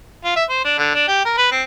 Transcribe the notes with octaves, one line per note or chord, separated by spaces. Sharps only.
F4
E5
C5
D4
D3
D4
G4
A#4
B4
C4